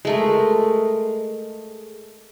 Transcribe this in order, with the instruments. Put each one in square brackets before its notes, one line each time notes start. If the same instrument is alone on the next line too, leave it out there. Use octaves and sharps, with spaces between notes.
[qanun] G#3 A3 A#4